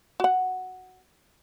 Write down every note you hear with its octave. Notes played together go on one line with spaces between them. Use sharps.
F#4 F#5